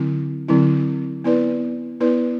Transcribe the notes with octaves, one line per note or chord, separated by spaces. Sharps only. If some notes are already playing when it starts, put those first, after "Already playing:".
Already playing: D3 F#3 C4 E4
D3 F#3 C4 E4
B3 E4 B4 D5
B3 E4 B4 D5